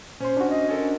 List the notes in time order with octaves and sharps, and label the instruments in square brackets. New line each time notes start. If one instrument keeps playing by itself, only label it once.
[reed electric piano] A#2 [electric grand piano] C#4 C6 [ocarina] C5
[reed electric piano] D4 F#4
[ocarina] D#5
[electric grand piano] C#4 A4 A#4
[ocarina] D4